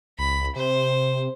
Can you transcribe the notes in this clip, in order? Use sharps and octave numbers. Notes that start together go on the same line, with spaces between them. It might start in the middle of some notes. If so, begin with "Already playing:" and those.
C#2 B5
C3 C5